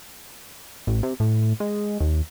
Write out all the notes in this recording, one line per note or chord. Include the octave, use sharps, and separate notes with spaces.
A1
C3
A2
G#3
D#2